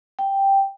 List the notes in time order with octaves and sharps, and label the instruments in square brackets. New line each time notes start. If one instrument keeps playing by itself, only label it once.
[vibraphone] G5